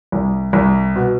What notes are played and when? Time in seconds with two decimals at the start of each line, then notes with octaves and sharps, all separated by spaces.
0.12 C2
0.53 C2
0.96 B2